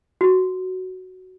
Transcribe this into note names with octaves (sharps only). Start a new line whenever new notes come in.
F#4